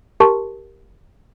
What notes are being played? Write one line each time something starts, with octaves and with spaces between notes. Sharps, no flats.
G4 A#4 A5 C6 C#6